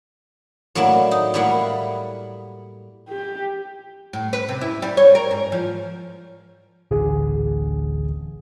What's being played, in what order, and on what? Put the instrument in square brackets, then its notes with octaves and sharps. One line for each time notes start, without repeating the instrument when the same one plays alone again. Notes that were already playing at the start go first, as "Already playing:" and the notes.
[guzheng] A2 F#3 A#3 D4 E4
D#4
A2 G3 A#3 E4 F5 F#5
[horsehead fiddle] G4
[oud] A2
B4
C3
E4
G3
C#5
A#4
G#2
F3
[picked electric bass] D1 A1 D3 [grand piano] G#4